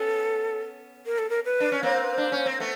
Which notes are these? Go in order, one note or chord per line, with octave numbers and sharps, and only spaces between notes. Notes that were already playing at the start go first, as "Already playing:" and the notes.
Already playing: B3 C#4 A4
A#4
A4
A#4
B4
D4
C#4
A#3 C4 C#5
C5
B4
D4 C5
C#4
C4
A3 B3